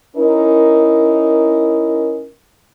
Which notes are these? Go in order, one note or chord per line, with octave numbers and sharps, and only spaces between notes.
C#4 D#4 E4 A#4